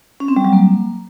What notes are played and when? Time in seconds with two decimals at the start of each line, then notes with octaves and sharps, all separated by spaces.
0.20 C#4
0.28 C4
0.36 G3
0.45 F#3
0.53 A#3